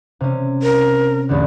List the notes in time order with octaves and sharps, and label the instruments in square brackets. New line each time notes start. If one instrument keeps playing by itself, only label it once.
[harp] C3 C#4
[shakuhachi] A#4
[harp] A1 E2 D3